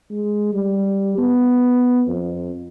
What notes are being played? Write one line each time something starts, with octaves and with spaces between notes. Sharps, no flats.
G#3
G3
B3
F2